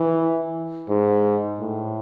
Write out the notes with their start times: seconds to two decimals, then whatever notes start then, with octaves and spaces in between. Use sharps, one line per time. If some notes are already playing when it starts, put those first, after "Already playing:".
Already playing: E3
0.89 G#2
1.59 A2